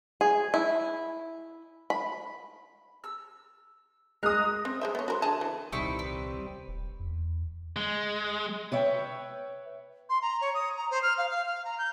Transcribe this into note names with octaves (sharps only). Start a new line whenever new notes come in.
G#4
E4
B5
E6
G#3 A#4 D#6 F#6
C4
G#3 C5 E5
B3 C#5
F#4 A#4 C5
D3 G#4 A5
E3
D#1 C2 G3 C4 D#4 E4 C#6
B4
D#1
E2
G#3
B4 C#5 E5 G5
C6
A#5
C#5
D#6
A#5
C5
F6
F5
F5
F5
A#5
G6